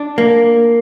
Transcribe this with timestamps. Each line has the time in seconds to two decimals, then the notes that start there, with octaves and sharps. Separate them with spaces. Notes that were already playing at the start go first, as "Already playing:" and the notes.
Already playing: D4
0.18 A#3